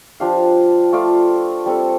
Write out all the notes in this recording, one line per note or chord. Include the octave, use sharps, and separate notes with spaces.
F3 D4 G4 F5
A3 F4 D5 F5
G3 C4 A4